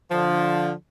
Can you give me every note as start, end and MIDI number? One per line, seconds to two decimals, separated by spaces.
0.11 0.71 50
0.11 0.71 53